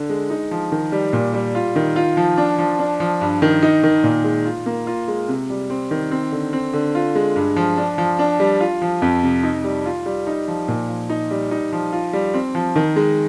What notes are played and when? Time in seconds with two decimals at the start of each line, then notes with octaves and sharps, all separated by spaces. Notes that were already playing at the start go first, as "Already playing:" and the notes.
Already playing: D3
0.09 G#3
0.30 D#4
0.51 F3
0.72 D#3
0.92 G3
1.13 A#2
1.34 G3
1.55 F4
1.76 D#3
1.96 F4
2.17 F3
2.38 D4
2.58 F3
2.79 D4
3.00 F3
3.21 G2
3.42 D#3
3.63 D#4
3.83 D#3
4.04 A#2
4.24 G#3
4.45 F4
4.66 A#3
4.87 F4
5.08 G#3
5.28 C3
5.50 G3
5.70 C4
5.91 D#3
6.11 C4
6.32 D3
6.53 C4
6.74 D3
6.95 F4
7.15 G#3
7.36 G2
7.56 F3
7.77 D4
7.98 F3
8.19 D4
8.40 G3
8.61 F4
8.82 F3
9.02 F2
9.23 C3
9.43 D#4
9.64 G3
9.86 F4
10.06 G3
10.27 D#4
10.48 F3
10.68 A#2
10.89 F3
11.10 D#4
11.31 G3
11.51 D#4
11.73 F3
11.93 F4
12.13 G3
12.34 C4
12.55 F3
12.76 D#3
12.96 G#3